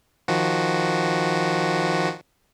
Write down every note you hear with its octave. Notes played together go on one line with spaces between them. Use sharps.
D#3 F3 F#4